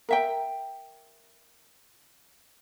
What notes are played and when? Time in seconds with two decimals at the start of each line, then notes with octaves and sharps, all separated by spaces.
0.09 A#4 E5 G5